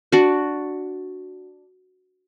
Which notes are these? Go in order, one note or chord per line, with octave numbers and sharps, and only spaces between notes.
D4 F#4